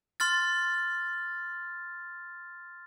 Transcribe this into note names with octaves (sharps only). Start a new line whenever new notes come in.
C6 F6 A6